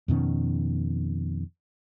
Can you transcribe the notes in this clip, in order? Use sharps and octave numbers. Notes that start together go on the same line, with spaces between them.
F2 B2 D#3 C#4